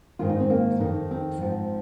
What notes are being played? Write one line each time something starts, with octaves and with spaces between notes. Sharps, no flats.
G#2 D#3 F4
D#4
C4
A#3
F2 D#3 D#4
C4
G#2 F3